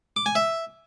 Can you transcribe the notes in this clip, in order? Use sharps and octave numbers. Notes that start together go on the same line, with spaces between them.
D6
G#5
E5